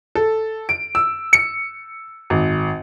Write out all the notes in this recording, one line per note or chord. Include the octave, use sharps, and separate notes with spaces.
A4
D7
E6
C#7
G#1